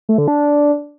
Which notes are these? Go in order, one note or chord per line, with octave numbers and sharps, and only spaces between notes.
A3
D3
D4